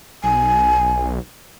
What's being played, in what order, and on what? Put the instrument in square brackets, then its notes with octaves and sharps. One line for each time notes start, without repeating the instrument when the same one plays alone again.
[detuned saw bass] B1 [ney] G#5